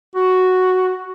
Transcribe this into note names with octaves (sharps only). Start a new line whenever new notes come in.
F#4